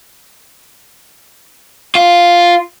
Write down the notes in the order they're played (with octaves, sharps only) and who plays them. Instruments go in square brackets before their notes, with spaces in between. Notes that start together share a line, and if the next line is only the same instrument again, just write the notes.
[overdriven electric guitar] F4